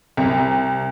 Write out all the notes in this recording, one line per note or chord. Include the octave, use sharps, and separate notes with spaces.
C2